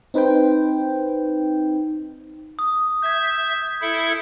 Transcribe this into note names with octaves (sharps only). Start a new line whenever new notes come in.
C4 D#4 B4 C5 G5
D#6
E5 G6 G#6
E4 A4 E5